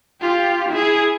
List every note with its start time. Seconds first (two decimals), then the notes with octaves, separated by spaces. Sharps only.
0.21 F4 G4
0.69 E4 G#4